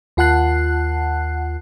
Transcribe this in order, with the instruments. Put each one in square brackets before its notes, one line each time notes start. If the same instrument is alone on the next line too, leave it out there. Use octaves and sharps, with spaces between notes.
[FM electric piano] D#2 F4 F#5 A5 F#6 C7